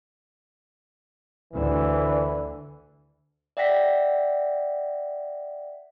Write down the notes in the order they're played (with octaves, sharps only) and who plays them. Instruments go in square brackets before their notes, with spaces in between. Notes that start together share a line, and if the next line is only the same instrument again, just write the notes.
[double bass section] D2 D3 [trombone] E3
[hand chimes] D5 E5 F#5 G5 A#6 B6